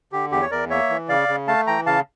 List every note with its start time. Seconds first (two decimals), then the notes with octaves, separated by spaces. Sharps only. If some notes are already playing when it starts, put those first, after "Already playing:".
0.12 D3 G4
0.32 E2 G4
0.42 C#5
0.51 E2 A#4 D5
0.70 A#3 C#5 E5
0.90 E3
1.09 C#3 D5 F5
1.28 C#3
1.47 A3 F5 A5
1.67 E3 G5 A#5
1.86 C#3 F5 A5